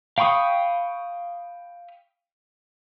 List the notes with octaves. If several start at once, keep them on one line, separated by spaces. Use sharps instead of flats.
F5 G5 B5 C#6 D#6